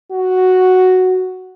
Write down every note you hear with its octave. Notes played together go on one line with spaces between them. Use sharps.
F#4